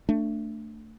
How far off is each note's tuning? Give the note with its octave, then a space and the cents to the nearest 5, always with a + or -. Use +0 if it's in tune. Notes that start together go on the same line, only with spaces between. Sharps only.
A3 +20 D4 +0